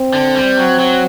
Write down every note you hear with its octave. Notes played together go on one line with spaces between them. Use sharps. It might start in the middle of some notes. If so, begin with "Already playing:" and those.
Already playing: C4
D3
G3
F#3
F#3